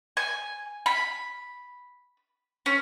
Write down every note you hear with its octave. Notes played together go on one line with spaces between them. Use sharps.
G#5
B5
C#4